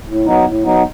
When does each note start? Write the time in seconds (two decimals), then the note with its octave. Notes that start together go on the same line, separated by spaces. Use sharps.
0.07 A2
0.26 F#3 B3 D#4
0.44 A2
0.63 F#3 B3 D#4